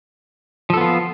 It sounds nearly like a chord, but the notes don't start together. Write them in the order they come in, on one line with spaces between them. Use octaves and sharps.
F3 A4 B3 F4